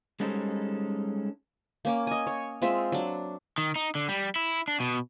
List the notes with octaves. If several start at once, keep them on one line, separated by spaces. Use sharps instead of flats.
G3 G#3 C#4 D#4 A4 C5
A#3 C#4 D6
D#5 G#5
C#5
G#3 C4 F4 E5
F#3 D4
D#3
D#4
D3
G3
E4
D4
B2